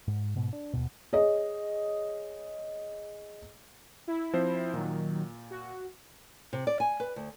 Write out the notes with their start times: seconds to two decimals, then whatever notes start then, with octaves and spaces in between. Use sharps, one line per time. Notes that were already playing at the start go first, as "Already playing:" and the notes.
0.08 G#2
0.36 G#2 B2
0.53 D4
0.73 D#2 B2
1.13 G#4 C#5 D#5
4.08 E4
4.33 F3 C4 C5
4.74 A#2 D#3 F#3
5.51 F#4
6.53 C3
6.67 D5
6.80 G#5
7.00 B4
7.16 D2